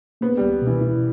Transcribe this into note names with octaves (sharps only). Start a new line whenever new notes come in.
A#3 B3
C#2 G3
B2 E3
E4